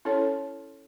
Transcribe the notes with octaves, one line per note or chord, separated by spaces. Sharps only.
C#4 E4 A4 C#5